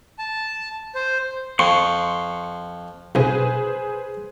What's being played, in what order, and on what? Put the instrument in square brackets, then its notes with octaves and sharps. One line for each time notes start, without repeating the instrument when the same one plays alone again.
[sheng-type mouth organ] A5
C5
[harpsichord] F2 [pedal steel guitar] C6 C#6
[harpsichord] B1 C3 [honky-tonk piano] G#4 B4 C5